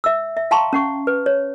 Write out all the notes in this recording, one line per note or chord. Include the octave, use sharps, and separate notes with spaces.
E5 E6
E5
F5 G5 A5 A#5 C6 C#6
C#4 F#5 C#6
B4
C#5